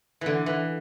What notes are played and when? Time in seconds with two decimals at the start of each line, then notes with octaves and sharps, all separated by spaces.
0.21 D3 E3
0.46 E3